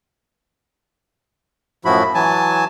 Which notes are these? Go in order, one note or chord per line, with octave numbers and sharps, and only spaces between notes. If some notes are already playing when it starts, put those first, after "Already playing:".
F#2 A2 F3 E4 F#4 B5
E3 F#3 G#5 A5